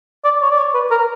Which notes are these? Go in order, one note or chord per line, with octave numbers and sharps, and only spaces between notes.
D5
C#5
D5
C#5
B4
A#4